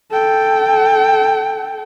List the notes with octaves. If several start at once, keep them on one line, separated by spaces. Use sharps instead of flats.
A4 G5